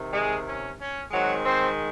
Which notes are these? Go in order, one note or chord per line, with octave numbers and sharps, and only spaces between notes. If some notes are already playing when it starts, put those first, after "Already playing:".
Already playing: C3 D#3
G#3 G#4
C#4
C#4
D#3 F#3 G#3 C4 F#4
C4 C5